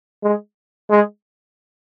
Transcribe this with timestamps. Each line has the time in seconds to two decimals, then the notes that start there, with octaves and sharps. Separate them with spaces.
0.23 G#3
0.90 G#3